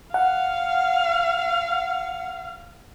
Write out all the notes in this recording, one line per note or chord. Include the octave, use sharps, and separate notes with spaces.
F5 F#5